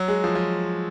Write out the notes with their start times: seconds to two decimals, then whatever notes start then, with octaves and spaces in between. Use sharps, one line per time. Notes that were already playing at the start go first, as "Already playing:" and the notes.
Already playing: F#3
0.08 G#3
0.24 F3
0.35 F3